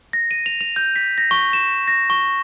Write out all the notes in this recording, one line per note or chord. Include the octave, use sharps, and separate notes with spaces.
A#6
D#7
F7
F7
G6
B6
A#6
C#6
E7
A#6
C#6